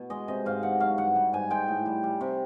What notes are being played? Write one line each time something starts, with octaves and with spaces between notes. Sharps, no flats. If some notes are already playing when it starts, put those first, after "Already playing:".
Already playing: B2
G#3 D#5
C3 D#5
G#2 F5
G#2 F#5
F#3 F5
G2 F#5
G3
G#2 G#5
G#3 G5
A2
G3
G3
C3